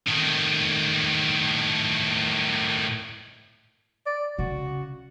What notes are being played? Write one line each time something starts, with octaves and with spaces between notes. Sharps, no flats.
A2 D#3
D5
C#3 F#4